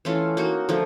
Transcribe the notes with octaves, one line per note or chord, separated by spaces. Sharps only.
E3 A3 C#4 F4
A#3 D#4 F#4
D3 F3 A3